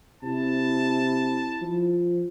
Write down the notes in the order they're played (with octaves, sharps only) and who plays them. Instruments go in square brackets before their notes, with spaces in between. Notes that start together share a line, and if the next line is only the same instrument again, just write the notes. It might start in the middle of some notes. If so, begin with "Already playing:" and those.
[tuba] C3 [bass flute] E4 [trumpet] A5
[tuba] F3